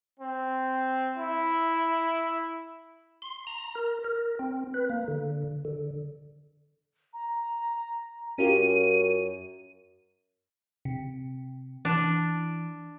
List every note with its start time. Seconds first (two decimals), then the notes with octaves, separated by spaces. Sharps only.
0.19 C4
1.17 E4
3.22 C6
3.47 A#5
3.75 A#4
4.04 A#4
4.39 C4
4.74 B4
4.90 A#3
5.08 D3
5.65 D3
7.13 A#5
8.38 F#2 C#4 F4 G4 D#7
10.85 C3
11.85 E3 D4